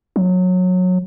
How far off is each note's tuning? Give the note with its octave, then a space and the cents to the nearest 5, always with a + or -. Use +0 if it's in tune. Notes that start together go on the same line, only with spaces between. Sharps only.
F#3 -20